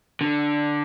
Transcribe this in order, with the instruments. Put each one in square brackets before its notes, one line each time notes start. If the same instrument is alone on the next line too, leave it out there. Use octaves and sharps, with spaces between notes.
[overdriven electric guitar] D3